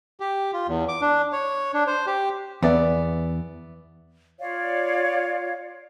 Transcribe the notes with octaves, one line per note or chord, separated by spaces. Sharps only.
G4
F4
E2
D6
D4
C#5
D4
C5
G4
E2 B3 D5 E5
F4 C#5 D5 F5